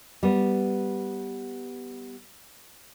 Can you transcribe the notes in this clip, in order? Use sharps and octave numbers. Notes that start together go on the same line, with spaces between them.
G3 B3